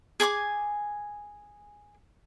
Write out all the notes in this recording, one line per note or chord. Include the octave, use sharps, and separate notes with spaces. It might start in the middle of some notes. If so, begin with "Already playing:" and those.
G#4 G#5 C#6 D6